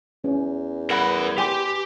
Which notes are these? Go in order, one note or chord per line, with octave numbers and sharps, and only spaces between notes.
E2 C#4
A#4 B4 F#5 B5 A#6
G4 G5 G#5 C6